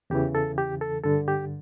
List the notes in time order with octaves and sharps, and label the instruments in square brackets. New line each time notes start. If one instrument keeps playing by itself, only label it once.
[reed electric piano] E2 C#3 E3 G4
A4
G4
A4
G2 D3 A4
G4